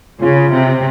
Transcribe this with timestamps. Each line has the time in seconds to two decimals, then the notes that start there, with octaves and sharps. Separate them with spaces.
0.21 C#3 F4
0.52 C3